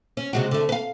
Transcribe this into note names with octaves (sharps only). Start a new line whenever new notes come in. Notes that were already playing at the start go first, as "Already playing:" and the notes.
C#4
C3 G#3 F#4
D3 A3
B4 F5